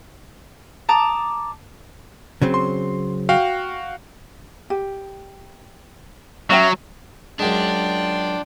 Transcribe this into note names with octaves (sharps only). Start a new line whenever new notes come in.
A5 A#5 D6 D#6
C#3 F#3 C4
C6
F#4 F5 G5
G4
F#3 C#4 E5 G5
F#2 G#3 D4 F4 G5